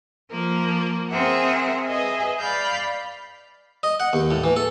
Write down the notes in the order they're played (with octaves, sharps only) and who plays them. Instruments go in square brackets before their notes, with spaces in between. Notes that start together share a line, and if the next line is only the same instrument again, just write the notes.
[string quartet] F3 A#3 A#4
C4 G#4 A#4 E5 F#5
G#4 B4 D#5 E5 G#5
D5 F5 B5 F6 G6
[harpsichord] D#5
F#5
D#2
A2
E3
A4